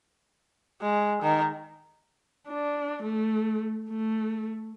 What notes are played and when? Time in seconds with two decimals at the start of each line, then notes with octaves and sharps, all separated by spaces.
0.82 G#3
1.22 D#3
2.48 D4
3.03 A3
3.90 A3